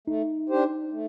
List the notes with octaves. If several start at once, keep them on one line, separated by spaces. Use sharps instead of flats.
A3 D#4
D4 G4 C5
A3